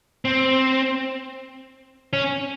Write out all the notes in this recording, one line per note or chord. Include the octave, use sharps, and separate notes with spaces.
C4
C#4